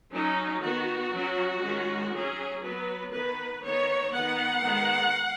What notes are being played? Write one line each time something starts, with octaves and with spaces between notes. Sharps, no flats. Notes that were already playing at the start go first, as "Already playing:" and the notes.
F#3 C#4 D#4
D#3 B3 F#4
F#3 C#4
D#3 G#3 C#4
F#3 C#4 G#4
F#3 B3 B4
D#3 B3 B4
D#3 B3 C#5
D#3 B3 F#5
D#3 G#3 B3